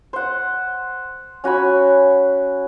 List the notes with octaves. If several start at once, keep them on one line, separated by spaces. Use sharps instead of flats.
C5 F#5
C#4 F#4 G#5 B5